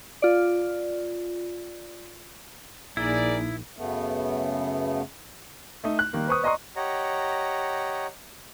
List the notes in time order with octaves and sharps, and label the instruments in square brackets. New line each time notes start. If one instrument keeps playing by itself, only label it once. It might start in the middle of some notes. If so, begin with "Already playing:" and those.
[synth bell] F4 D5
[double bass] A#1 [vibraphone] A#3 D#4 [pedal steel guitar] E4 [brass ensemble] G#4 A#4 D5
[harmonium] F#2 C#3 A3 B3
[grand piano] A3 D#4
F#6
D#3 G3 A#3
B4 C5 C#6 D#6
D5 D#5 A#5 C6 C#6 D#6
[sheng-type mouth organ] G4 C#5 D#5 F#5 A#5